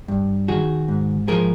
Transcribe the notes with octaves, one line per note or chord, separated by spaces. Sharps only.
G2
D#3 F#4 G#4
G#2
F3 G#4 A#4